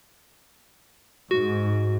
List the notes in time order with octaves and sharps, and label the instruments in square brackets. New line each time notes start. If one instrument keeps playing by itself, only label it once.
[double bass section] G#2 [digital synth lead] F#4